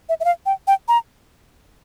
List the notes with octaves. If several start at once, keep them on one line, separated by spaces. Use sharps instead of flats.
E5
E5
F5
G5
G5
A#5